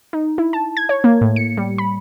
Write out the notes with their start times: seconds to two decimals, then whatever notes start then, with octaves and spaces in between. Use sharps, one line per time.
0.13 D#4
0.38 E4
0.53 A5
0.77 G#6
0.89 C#5
1.04 A#3
1.21 A2
1.36 C#7
1.57 G3
1.78 B5